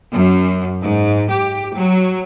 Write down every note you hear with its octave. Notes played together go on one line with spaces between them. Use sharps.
F#2
G#2
G4
F#3